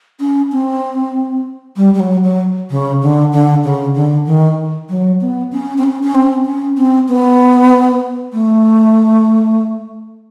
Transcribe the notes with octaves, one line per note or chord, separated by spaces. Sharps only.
C#4
C4
G3
G3
F#3
F#3
C#3
D3
D3
C#3
D3
D#3
F#3
B3
C#4
C4
C#4
C#4
C4
C#4
C4
B3
A3